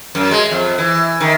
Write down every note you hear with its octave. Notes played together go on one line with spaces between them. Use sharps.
F#2
G#3
F2
E3
D#3